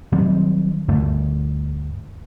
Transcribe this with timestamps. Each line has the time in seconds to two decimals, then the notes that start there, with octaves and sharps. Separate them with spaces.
0.13 D#3 F#3 G3 C4
0.89 D2 G2 D3 A3